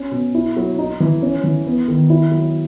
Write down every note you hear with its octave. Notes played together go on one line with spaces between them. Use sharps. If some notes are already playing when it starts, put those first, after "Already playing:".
Already playing: C#4
B2
E4
F#3
D#4
E3
C#4
E3
B3
D#3
E4
F#3